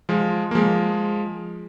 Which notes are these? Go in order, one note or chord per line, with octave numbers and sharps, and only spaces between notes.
F3 G#3
A#3
F3 G#3